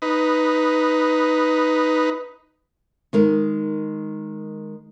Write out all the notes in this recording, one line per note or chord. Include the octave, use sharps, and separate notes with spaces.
D#4 B4
D#3 G#3 A#4